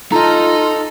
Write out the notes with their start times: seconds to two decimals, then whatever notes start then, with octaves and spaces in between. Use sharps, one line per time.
0.12 D#4 F4 A4 D#5 A#5